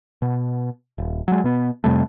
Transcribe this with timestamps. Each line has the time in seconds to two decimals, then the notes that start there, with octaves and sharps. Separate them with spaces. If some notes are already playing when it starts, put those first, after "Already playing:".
0.22 B2
0.98 D#1
1.28 F#3 G#3
1.44 B2 B3
1.84 F2 C3 G3 A3